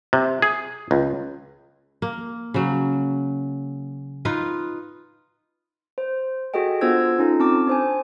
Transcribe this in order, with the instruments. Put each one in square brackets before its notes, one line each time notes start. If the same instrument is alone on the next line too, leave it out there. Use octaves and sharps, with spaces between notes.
[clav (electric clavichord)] C3
G#4
C#2
[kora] A#3
C#3 F#3
D#4 F4 B4
[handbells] C5
F#4 G#4 A4 D#5 G5
B3 D4 F4 C5 E6 G#6
C#4 D#4 F4 A4
C4 A5 D6
D4 C5 G#5